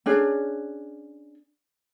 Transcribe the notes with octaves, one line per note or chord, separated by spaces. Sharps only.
C#4 D4 G#4